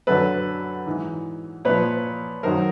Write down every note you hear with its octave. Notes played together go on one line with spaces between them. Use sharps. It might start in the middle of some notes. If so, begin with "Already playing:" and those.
F#2 D3 F#3 A4 B4
G#2 E3
A#2 F3 B4 C#5
F#2 D#3 F#3 A#4 C5